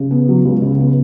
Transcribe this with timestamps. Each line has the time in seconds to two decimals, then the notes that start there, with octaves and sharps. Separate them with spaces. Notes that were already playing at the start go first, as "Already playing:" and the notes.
Already playing: C#3
0.11 B3
0.29 F#3
0.45 C#2
0.62 C#3
0.78 B3